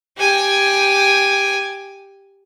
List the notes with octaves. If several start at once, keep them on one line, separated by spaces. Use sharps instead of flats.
G4 G#5